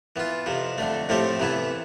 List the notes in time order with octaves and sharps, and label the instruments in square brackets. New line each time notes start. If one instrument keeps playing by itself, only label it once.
[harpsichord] E3 B3 F4
F2 C3 F3
F2 D3 A3
A2 F3 A3 C4 G4
C3 E3 B3 E4